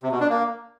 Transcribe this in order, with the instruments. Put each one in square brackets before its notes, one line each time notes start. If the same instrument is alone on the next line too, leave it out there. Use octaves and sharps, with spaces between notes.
[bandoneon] C3
B2
D4
A#3